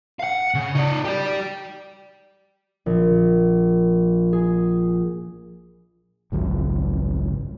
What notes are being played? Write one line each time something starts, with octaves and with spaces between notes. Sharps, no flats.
F5 F#5
C#3
D#4 D5
G4 D5
A#1
G#4
G#1 C#2 F#2